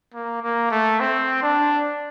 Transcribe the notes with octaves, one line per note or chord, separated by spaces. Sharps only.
A#3
A#3
A3
C4
D4